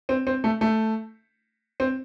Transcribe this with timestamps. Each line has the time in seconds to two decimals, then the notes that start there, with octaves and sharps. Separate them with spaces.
0.09 C4
0.27 C4
0.44 A3
0.61 A3
1.80 C4